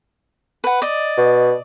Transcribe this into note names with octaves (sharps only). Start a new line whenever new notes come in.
B4 F#5
D5 D#5
B2